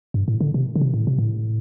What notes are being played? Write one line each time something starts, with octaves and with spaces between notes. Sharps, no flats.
G2
A2
D3
C3
D3
C3
A2
C3
A2